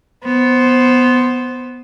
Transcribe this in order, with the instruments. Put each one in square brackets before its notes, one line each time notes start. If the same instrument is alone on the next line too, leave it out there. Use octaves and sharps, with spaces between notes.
[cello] B3 C5